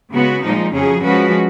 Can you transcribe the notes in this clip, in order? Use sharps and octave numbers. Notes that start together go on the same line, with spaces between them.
C#3 G#3 B3 F#4
A#2 F3 G#3 D#4
F2 C#3 F#3 C#4 G#4
F3 G#3 C#4 F#4 B4